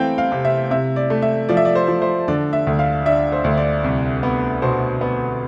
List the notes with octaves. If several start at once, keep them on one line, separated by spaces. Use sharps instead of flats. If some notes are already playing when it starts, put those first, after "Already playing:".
Already playing: E3 A3 C4 F5 G5
F5
C3
E5
C3 E5
D5
A3
E5
F3 D5
E5
D5
C5
F3
C5
D3 D5
E5
D2
F5
D4 E5
C5
D2
D5
C2
B3
B2 C5
B3